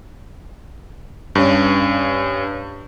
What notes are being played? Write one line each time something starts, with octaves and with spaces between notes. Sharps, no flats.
G2 C#4